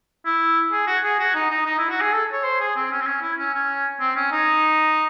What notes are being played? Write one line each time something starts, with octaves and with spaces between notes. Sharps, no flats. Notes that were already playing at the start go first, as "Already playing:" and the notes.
E4
G#4
F#4
G#4
F#4
D#4
D#4
D#4
E4
F#4
G#4
A4
C#5
C5
G#4
C4
C#4
C4
C#4
E4
C#4
C#4
C4
C#4
D#4